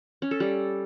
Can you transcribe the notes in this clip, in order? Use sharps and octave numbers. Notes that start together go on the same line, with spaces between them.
C#4
A4
G3